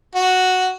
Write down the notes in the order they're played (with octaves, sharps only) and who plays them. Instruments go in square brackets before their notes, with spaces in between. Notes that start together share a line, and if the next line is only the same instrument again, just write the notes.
[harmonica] F#4